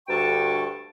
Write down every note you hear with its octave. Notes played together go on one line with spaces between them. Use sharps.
D2 G2 A4 G5 A5 C#6